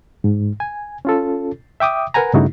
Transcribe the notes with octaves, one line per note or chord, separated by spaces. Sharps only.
G#2
G#5
C#4 F4 A4
E5 G5 D6 D#6
A#4 B4 F#5 G#5 A#5
G2 C#3 A3 D#4 E4 F#4